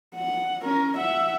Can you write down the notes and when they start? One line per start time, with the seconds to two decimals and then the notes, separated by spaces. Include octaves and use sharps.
0.15 F#5
0.62 C#4 A#4
0.98 E5 F#5